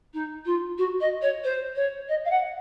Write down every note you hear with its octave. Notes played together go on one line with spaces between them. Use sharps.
D#4
F4
F#4
D#5
C#5
C5
C#5
D#5
F5
F#5